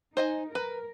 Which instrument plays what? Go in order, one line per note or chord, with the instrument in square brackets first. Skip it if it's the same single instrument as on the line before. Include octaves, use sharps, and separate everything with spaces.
[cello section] D#4 [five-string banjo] C5 D#5 G#5
[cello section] A#4 [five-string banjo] B4